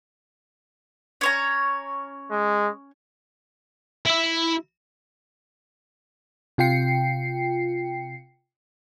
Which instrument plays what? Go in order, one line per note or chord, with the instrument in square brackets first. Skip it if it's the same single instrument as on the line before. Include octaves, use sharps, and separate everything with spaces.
[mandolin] C#4 C#5 A#5
[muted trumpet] G#3
[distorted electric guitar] E4 E5
[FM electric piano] C3 F4 G5 C7 C#7